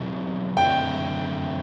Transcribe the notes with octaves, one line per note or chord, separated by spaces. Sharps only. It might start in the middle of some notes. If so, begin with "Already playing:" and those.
Already playing: B2 F#3 C4 E4 G4
F#2 D3 A3 C4 E4 G5